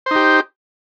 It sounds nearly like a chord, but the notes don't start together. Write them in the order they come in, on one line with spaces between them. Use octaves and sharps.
C5 D#4 G4